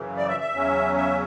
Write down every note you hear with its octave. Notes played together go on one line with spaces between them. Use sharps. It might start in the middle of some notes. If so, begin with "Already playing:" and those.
Already playing: F#2 C#3 E3
D5
E5
E5
E2 C#3 F#3 C#4
E5